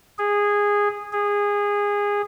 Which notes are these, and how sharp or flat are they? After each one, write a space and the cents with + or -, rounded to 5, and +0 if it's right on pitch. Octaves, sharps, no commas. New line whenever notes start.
G#4 -15
G#4 -20